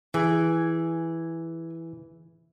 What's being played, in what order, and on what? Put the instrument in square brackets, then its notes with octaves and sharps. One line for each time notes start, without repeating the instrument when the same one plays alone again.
[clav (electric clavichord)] E3 [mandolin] G#4